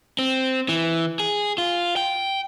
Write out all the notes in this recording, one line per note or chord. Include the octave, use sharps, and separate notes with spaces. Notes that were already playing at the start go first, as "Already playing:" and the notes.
C4
E3
G#4
F4
G5